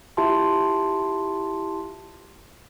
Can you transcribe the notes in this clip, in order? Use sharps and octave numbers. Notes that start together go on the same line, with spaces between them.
E4 F4 G4 E5 A5 C6